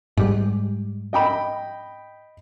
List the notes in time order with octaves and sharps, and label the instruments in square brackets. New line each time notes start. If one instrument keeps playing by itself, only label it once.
[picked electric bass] G#2 G3
[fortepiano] D#5 G5 B5